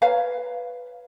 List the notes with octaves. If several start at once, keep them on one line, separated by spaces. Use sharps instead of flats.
B4 C#5 F5 A#5